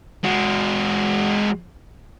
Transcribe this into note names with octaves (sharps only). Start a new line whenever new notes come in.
G#3 F#4